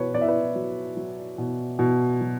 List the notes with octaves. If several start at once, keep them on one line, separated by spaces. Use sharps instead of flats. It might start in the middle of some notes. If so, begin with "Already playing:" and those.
Already playing: B2 B4 C#5
B2 D5
E5
B4 D5
F#3
F#3
B2
B2
F#3